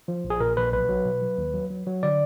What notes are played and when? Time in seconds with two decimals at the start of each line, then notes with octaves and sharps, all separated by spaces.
0.08 F3
0.24 A#1
0.30 G#4
0.40 A#2 A#4
0.57 A#1 B4
0.73 B1 B4
0.89 F#3
1.05 B2
1.22 F#3
1.38 D#2
1.54 F#3
1.70 F#3
1.87 F#3
2.03 D3 D5